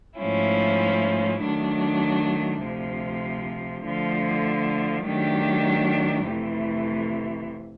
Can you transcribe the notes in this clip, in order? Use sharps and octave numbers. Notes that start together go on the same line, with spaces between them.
G#2 F3 A3 C#4 E4
D#3 F#3 A3 D4
D2 C3 F3
D3 F3 A3
D#3 F#3 A3 D4 G4
F2 C3 E3 A3